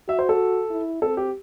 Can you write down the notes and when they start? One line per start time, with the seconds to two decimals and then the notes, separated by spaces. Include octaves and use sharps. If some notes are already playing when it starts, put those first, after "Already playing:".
0.08 F#4 E5
0.19 C5
0.29 A4
0.70 E4
1.02 C4 A4
1.17 G4